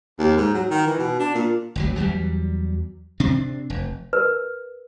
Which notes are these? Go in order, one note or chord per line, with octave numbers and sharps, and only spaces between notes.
D#2
G#2
F#3
D#3
E3
B2
D4
A#2
G1 D2 F#3
E2 F#3 G3
C3 C4 D4
F1
A#4 B4